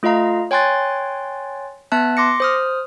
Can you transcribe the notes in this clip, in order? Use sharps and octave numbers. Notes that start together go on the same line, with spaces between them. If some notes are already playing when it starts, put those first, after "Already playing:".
A3 F4 D#5 F5 A#5
C#5 G5 G#5 C6 F#6 A6
B3 E5 A5 F#6
C6 D6 A#6 C#7
C5 D#6 F6